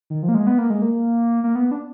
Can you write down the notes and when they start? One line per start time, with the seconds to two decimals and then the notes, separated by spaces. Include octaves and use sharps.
0.10 D#3
0.23 F3
0.29 A#3
0.35 G#3
0.47 B3
0.58 A#3
0.70 G#3
0.82 A#3
1.44 A#3
1.55 B3
1.71 D4